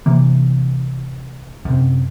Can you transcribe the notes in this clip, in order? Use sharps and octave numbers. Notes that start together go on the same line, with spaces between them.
C3 E3 A#3
F#2 C3